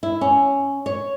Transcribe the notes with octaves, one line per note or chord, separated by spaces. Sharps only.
E4
C#4
C#5